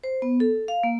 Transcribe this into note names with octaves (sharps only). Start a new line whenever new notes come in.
C5
B3
A4
F5
A#3